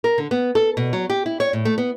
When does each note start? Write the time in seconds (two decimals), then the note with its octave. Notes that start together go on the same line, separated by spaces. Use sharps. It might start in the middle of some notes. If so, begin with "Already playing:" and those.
0.04 A#4
0.18 D3
0.31 B3
0.55 A4
0.77 B2
0.93 F#3
1.10 G4
1.26 E4
1.40 C#5
1.53 A2
1.65 A3
1.78 B3